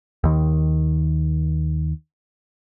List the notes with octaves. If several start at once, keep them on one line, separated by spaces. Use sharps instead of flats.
D#2 D#3